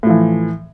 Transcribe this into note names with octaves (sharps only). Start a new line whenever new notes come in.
A2 E3 F3